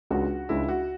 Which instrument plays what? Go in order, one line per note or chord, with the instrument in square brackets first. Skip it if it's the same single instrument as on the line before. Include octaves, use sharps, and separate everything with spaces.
[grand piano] C#2 C#3 G#3 D4 [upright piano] F#4
[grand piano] C#2 C#3 G#3 D4 [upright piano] E4
[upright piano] F#4